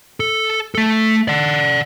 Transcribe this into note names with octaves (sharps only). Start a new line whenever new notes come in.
A4
A3 A4
D5 F#5